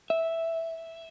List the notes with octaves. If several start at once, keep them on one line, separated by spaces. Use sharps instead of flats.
E5